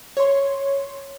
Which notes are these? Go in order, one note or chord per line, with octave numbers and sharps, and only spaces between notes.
C#5 C6